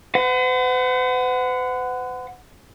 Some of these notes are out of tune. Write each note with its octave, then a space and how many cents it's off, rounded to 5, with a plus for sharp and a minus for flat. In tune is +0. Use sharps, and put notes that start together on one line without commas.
B4 +45 F#5 +0